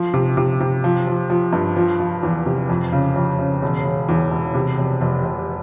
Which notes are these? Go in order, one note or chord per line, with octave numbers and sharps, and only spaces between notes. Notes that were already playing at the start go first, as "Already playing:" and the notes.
Already playing: F3
C3
C3
C3
F3
F3
F3
G2
F3
F3
E2
C3
F2
C#3
F2
C#3
E1
E1
E2
E1
C3
F1
F1
F1